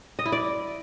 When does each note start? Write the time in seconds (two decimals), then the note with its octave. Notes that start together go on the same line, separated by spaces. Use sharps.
0.19 D#5
0.26 E4
0.32 D5